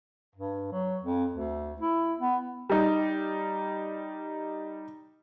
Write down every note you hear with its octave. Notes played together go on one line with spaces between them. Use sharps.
G2
F#3
F2
D2
E4
B3
G3 D#4